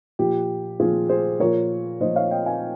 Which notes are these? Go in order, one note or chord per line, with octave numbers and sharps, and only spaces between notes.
A#2 F3 G4
A#2 F3 F4 G#4
G#4 C5
A#2 F3 A#4 C#5
A#2 F3 C5 D#5
C#5 F5
D#5 G5
F5 G#5